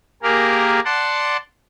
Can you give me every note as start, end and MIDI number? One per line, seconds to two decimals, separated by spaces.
0.23 0.80 58
0.23 0.80 67
0.23 0.80 68
0.23 0.80 70
0.85 1.37 74
0.85 1.37 78
0.85 1.37 81
0.85 1.37 84